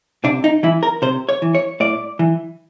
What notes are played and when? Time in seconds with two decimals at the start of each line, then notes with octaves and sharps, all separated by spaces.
0.24 C3 D4
0.44 D#4
0.63 E3 E4
0.83 A#4
1.02 C3 C5
1.29 C#5
1.42 E3
1.55 C#5
1.80 A2 D5
2.19 E3